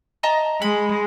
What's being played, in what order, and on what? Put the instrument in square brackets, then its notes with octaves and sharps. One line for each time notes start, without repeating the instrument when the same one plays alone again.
[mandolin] D#5 A5 A#5
[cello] G#3 [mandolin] B5